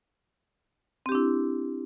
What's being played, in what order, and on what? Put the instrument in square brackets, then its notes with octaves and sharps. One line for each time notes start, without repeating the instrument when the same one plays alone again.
[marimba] C4
G4
D4
E4